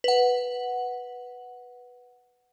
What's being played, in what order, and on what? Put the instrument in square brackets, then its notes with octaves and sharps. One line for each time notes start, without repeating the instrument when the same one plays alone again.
[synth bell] B4 F#5